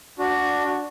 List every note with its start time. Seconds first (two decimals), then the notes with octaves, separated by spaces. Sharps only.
0.19 D4 F#4